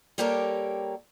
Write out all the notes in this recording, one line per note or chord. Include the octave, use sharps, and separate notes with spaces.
G3 A#3 G4 A4 A#4 C#5